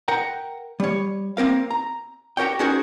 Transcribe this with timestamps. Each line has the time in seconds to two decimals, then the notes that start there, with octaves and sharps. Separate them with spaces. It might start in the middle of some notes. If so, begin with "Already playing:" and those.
0.08 A#4 F#5 G5 A#5
0.80 G3 C#5
1.37 A#3 C4 A#4 F5
1.71 A#5
2.37 F#4 G4 A#4 C#5 G5
2.59 C#4 D#4 F#4 G#4 A#4 C5